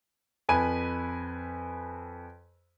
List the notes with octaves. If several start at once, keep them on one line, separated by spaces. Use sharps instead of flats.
F2 B4 G#5 B5 D#7